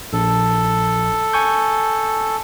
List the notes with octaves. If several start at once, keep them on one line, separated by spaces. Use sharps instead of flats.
A#1 A4
G#5 C#6 G6